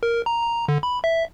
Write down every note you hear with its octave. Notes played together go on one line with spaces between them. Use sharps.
A#4
A#5
A#5
D3
B5
E5